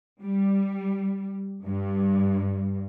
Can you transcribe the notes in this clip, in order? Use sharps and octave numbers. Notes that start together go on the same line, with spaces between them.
G3
G2